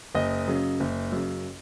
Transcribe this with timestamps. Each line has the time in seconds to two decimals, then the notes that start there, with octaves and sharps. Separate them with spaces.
0.15 F#1 D#5
0.47 F#2 C#3
0.80 F#1
1.12 F#2 C#3